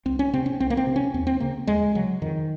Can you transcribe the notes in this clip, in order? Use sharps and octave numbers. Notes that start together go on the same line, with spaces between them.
C2 C4
C#4
C3 C4
C#4
C2 C4
A#3
C4
C3
C#4
D#2 C4
C4
C#3 A#3
D#2 G#3
C#3 F#3
F2 D#3